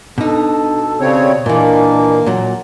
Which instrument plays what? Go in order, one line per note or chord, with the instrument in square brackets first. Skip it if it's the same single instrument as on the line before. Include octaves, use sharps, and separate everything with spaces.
[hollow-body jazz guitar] B2 D#4 [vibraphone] D4 [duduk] A4
[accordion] C#3 C4 C#5 [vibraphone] G4 D5
[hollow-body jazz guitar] A#2 E3 [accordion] A#3 [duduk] D4 [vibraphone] A#4 D#5 G#5
[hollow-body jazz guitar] A#2 F#3 [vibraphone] F#5